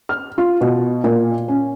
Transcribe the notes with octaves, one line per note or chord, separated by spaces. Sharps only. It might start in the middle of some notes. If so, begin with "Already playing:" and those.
F6
F4
B2
A#2
C#4